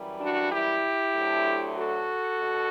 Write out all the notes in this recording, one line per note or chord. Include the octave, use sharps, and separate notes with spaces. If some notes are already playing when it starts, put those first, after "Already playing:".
Already playing: F#2 E3 G3
D4 F#4
E4 G4
D2 D3 F#3 A3
F#4 A4
B2